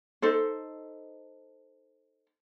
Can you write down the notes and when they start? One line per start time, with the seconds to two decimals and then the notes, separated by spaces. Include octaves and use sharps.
0.22 D#4 A4 C5